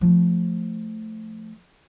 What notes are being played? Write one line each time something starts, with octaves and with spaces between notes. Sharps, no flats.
F3 A3